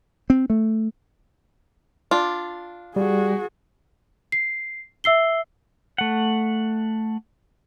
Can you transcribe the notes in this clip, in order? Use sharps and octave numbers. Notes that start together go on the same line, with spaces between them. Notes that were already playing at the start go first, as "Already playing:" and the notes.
C4
A3
D4 F4
G3 F#4 G#4
C7
E5 E6 C7 G7
A3 F#5